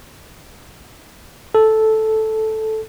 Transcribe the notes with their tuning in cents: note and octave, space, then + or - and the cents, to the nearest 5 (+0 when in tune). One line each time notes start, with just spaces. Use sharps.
A4 -5